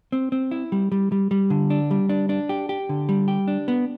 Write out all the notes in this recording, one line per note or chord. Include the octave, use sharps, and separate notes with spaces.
C4
C4
E4
G3
G3
G3
G3
D3
D4
G3
D4
D4
G4
G4
D3
G3
G4
D4
B3